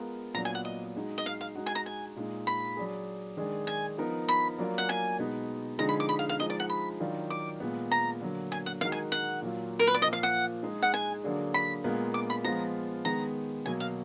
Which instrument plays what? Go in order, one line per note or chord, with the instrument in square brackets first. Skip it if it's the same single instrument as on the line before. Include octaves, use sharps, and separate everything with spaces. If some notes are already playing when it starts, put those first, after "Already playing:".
Already playing: [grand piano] G#3 B3 F4 A#4
[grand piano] A#2 F#3 B3 D4 [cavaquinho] A#5
[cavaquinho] G#5
F#5
D#5
[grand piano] G#3 D#4 F#4
[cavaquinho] D#5
F5
F5
[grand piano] G#3 D#4 F#4
[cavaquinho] G#5
A#5
G#5
[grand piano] A#2 G#3 D#4
[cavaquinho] B5
[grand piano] F#3 D4 G#4
D#3 G#3 D4 G#4
[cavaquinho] G#5
[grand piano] F3 B3 D#4 A#4
[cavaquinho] B5
[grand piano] F#3 A#3 D4 F4 A#4
[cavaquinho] F#5
G#5
[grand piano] B2 G#3 B3 D#4
[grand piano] D3 F3 G#3 D#4 G#4 [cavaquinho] A#5
[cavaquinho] B5
D6
B5
F5
F5
[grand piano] F3 G#3 D#4 [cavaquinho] D#5
[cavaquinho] D5
F#5
B5
[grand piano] D#3 F#3 D4 F4
[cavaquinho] D6
[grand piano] A#2 G#3 B3
[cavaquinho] A#5
[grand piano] D3 F#3 A#3
[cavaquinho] G#5
F#5
[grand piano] D#3 G#3 D#4 F#4 A#4 [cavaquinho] F5
[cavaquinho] G#5
F#5
[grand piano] A#2 F#3 A#3 F4
[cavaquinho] A#4
B4
D5
[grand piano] A#2 F3 A#3 [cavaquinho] D#5
[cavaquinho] F5
F#5
[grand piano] G#3 D#4 G#4
[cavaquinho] F#5
G#5
[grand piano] D3 F#3 A#3 D4 G#4
[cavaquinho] B5
[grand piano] A#2 G#3 B3 F4 A#4
[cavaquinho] D6
B5
[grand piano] F3 G#3 B3 F4 [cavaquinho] A#5
[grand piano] D#3 G#3 B3 [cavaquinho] A#5
[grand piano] B2 F#3 A#3 [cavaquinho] G#5
[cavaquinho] F5